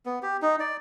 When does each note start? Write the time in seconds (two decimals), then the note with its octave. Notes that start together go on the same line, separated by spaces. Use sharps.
0.06 B3
0.23 G4
0.42 D#4
0.60 D5